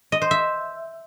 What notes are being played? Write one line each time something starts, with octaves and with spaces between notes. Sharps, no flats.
D#5
C5
E5